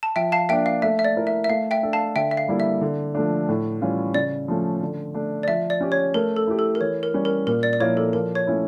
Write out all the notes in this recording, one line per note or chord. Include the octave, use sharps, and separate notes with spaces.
A5
F3 E5 G5
F5 A5
A#3 D4 E5 G5
F5
A3 E5
E5
D5
E4 A#4
E5
E5
A3 F5
E5 G5
D4 A4
F5 A5
D3 E5 G5
E5
F5
G3 A#3 E4 A4
E5
D3
F3 A3 D4
A2
E3 G3 C#4 F4
C#3 D5
F3 A3 C#4
D3
A3 D4
D5
F3 E5
D5
C#4 G4
C#5
A3 A#4
A4
E4 G4
A4
A#4
E3 C#5
A#4
G3 C#4
A#4
A#2 A#4
D5
D5
F3 A#3 E4 C#5
A4
F3 A#4
C#5
A3 C#4 E4